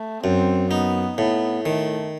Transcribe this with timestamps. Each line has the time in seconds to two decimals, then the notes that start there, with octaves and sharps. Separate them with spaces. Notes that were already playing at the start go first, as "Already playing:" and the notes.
Already playing: A3
0.24 F#2 C4
0.71 B3 D#4
1.18 A2 B3
1.65 D#3 A3